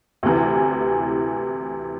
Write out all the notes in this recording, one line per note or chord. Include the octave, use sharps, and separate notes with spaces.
D2 C3 E3